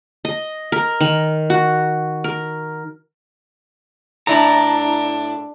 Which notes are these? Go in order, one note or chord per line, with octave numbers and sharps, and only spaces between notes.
D#5
A#4
D#3
F#4
A#4
A2 D4 E4 A#5